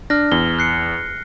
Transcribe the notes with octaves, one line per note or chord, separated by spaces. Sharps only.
D4 F6 A#6
E2 G7
F#6 C7 C#7